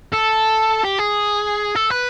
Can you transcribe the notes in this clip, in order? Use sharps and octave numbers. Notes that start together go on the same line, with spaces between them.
A4
G4
G#4
A4
B4